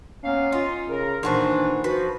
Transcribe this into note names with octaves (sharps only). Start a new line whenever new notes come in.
A#3 B3 C#4 F5
D#4 F4
C#3 A#4
A#2 D#3 E3 D4 F#4 C5
F3 F#4 B4